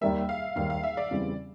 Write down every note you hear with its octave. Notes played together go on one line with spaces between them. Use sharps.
D#2 D#3 G3 A#3 E5
F5
D#2 D#3 G3 A#3 F5
F5
E5
D5
E2 C#3 E3 G3 C4